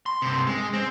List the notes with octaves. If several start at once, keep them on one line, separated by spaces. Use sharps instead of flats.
C6
G2 C3
G#3
C4